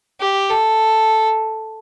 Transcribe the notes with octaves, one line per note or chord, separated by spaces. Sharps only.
G4
A4